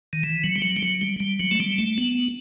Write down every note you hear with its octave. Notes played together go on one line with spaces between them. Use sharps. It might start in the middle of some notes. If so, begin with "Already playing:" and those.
D#3
E3
F#3
G3
F#3
G3
F#3
G3
G3
F#3
A3
G3
A3
B3